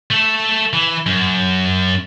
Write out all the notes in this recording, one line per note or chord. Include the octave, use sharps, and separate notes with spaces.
A3 A4
E3
F#2